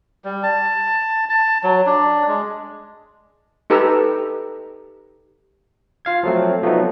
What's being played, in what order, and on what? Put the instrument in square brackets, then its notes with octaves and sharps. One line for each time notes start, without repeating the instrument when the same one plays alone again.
[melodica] G3
A5
A5
F#3
D4
G#3
[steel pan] D#4 G4 A4 B4 A#5 E6
[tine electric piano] F4 F5 G#6
F3 F#3 A3 C4
F3 F#3 A3 B3 C4 D#4